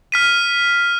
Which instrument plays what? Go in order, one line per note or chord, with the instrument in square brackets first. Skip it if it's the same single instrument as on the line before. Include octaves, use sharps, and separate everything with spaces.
[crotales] F6 B6 D#7